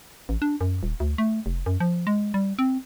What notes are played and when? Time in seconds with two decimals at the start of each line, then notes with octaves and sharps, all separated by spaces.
0.29 A1
0.42 D4
0.61 F#2
0.83 D#1
1.00 D2
1.18 A3
1.46 F1
1.66 F#2
1.80 F3
2.07 G#3
2.34 G3
2.59 C4